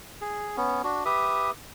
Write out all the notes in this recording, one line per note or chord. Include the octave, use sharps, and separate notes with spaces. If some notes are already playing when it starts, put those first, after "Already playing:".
G#4
B3 C#4
D4 F#4
G4 B4 E5 D#6